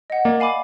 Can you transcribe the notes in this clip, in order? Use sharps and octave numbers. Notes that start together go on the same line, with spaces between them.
D#5 F#5
A#3 D5
F5 G#5 B5 D6